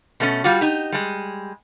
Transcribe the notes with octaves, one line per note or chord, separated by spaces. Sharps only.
B2 A3 C#4
G3 F4 F#4
D#4 G4
G3 G#3